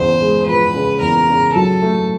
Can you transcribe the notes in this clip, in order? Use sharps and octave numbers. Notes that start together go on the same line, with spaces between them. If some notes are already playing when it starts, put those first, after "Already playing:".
Already playing: E2 C#3 C5
G#3
F3 B4
C#3
E2 A#4
C#3
F#3 A4
A3